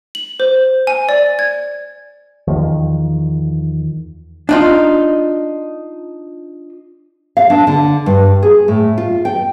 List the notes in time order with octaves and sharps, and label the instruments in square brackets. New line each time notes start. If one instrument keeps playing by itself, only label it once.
[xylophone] F#7
C5
G#5
D5
G#6
[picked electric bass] E2 D#3 F3
[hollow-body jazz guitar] D4 D#4 F4
[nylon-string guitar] F5
D4
D3
G2
G#4
A2
F4
G5